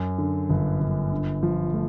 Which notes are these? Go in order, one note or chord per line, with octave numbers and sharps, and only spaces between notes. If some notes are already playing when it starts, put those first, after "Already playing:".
Already playing: F#2
D3
G1
G1
D3
F3
A3